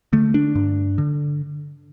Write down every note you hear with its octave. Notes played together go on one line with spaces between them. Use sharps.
D3 A3
D4
G2
D3